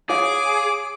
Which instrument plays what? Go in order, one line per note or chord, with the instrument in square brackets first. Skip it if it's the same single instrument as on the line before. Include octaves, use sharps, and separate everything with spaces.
[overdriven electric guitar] G#4 [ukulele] C#5 F5 [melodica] D6